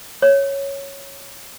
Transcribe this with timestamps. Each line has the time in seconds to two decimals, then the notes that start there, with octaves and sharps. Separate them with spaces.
0.22 C#5